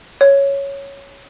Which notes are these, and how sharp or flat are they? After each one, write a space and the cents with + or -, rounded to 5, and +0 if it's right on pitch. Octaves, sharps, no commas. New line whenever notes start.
C#5 +0